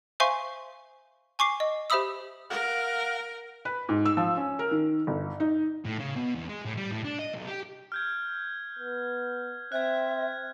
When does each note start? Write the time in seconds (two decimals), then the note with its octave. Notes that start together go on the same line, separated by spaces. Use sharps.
0.20 C5 E5 F5 G#5 C6 C#6
1.39 G#5 C#6 D6 C7
1.60 D#5
1.90 G4 C5 E5 B5 D#6 E6
2.50 A#4 F5 F#5
3.65 B4
3.89 G#2
4.05 E6
4.17 F3
4.37 C#4
4.59 A#4
4.71 D#3
5.07 G1
5.40 D#4
5.85 A2
6.00 C#3
6.16 B2
6.35 E2
6.49 G#3
6.65 A2
6.77 G3
6.91 A2
7.04 D4
7.19 D#5
7.34 B1
7.47 G4
7.92 F6 G6 G#6
8.79 B3
9.72 C4 E5 F#6 G#6